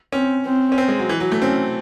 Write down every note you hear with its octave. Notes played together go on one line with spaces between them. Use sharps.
C4 C#4
C4
C#4
C4
G#3
F#3
E3
F#3
A3
C4 C#4